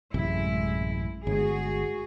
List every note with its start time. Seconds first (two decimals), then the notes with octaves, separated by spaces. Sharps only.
0.14 A1 F#2 C3 G#3 E4
1.27 G1 G#3 F#4 G#4